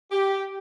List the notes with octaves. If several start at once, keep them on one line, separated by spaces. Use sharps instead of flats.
G4